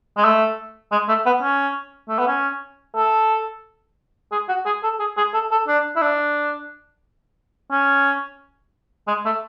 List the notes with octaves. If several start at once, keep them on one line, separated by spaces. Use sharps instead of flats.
G#3
A3
G#3
A3
B3
C#4
A3
B3
C#4
A4
G#4
F#4
G#4
A4
G#4
G#4
A4
A4
D4
E4
D4
C#4
G#3
A3